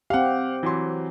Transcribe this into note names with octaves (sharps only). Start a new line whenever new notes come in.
C4 G4 F5 F#5
E3 F#3 C6